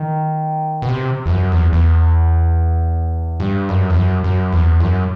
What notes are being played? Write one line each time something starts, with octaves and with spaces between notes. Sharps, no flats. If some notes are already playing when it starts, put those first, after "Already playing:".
Already playing: D#3
B2
C3
E2
F#2
E2
E2
G2
F#2
E2
F#2
F#2
E2
F#2